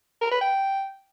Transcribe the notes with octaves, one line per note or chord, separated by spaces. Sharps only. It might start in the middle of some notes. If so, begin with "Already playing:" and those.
A#4
B4
G5